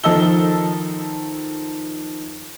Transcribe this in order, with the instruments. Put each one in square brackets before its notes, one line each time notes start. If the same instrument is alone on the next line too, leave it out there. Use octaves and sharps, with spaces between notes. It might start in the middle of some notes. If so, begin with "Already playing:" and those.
[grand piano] D#3 F3 A4 D#5 E6 G7